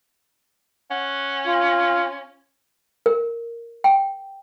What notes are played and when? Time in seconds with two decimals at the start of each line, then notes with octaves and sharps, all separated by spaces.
0.91 C#4 F#5
1.46 F4
3.06 A#4
3.84 G5